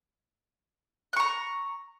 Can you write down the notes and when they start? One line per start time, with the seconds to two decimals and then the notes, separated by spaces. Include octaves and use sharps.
1.13 F#6
1.16 C#6
1.20 A#5